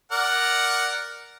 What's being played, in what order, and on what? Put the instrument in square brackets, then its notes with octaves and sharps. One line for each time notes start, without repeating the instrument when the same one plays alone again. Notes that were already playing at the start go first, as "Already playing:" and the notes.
[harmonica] A#4 D5 F#5